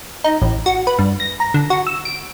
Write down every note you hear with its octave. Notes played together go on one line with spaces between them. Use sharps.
D#4
A1
F#4
B4
G2
A#6
A#5
D3
F#4
E6
D7